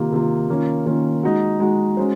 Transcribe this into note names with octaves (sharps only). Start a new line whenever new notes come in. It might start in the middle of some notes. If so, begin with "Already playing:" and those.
Already playing: C3 D#3 A#3 F4
C3 D#3 A#3 F4
D#3 A#3 C#4 F4
D#3 A#3 C#4 F4
G#3 D#4 F#4
G#3 D#4 F#4
G#3 C#4 F#4 C5